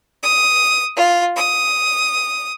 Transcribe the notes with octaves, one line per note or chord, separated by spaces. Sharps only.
D#6
F4
D#6